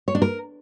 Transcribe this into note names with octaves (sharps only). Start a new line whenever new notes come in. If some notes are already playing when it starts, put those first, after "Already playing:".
C#5
D4
A#4